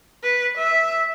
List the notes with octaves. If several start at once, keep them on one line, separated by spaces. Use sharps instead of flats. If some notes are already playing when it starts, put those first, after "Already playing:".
B4
E5